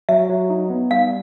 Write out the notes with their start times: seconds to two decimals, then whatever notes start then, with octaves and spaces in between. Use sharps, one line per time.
0.09 F#3 E5
0.29 F#3
0.50 D#4
0.70 B3
0.91 G3 F5